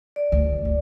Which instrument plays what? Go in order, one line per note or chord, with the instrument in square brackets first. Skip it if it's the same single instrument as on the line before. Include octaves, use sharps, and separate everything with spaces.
[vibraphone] D5
[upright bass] D2
D2